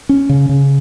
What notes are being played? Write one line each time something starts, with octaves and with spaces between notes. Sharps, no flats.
C#4
C#3
C#3